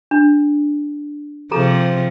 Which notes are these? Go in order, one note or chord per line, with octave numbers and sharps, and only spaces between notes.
D4
C3 F3 G#4 A4 A#5